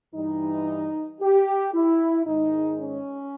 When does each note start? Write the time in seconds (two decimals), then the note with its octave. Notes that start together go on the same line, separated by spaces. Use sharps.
0.14 G2 E3 G3 D#4
1.21 G4
1.74 E4
2.26 G#2 D#3 G#3 D#4
2.80 C#4